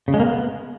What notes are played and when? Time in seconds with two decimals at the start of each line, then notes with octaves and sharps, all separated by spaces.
0.08 C#3
0.14 G#3
0.20 A#3
0.26 B3